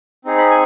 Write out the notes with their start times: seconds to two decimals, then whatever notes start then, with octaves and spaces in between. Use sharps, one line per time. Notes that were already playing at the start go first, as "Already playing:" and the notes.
0.25 C4 D#4 G#4
0.38 B5
0.50 G#5